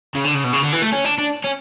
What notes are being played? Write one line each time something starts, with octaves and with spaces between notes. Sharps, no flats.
C#3
D3
C#3
B2
C#3
D3
E3
A3
C#4
D4
D4
C#4